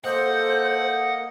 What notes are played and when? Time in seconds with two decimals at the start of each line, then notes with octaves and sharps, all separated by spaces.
0.04 A#3 A4 C5 D#5 F#5